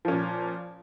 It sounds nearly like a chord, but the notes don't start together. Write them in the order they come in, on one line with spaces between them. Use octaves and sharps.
F3 C#4 A#2